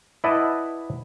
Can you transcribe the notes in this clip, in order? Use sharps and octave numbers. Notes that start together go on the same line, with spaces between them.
E4 B4 D5 D#5 F#5 A5